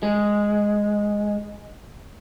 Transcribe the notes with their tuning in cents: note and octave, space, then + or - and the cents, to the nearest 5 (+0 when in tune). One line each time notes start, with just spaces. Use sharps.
G#3 -5